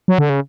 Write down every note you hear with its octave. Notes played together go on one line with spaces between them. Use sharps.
F#3
D3
C#3